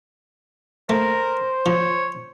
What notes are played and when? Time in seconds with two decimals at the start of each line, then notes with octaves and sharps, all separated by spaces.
0.90 A3 A#4 C5
1.66 F3 C#5